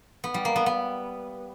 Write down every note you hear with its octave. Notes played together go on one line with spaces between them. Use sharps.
B3
G3
A#3
B3
B3